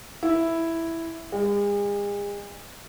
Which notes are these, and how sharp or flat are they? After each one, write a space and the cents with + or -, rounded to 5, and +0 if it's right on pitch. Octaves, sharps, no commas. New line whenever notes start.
E4 +0
G#3 -40